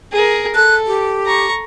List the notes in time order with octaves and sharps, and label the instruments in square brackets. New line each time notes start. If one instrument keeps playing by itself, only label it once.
[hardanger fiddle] G#4 A#4
[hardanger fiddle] A4 [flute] F#6
[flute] G4
[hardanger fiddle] A#5 C#6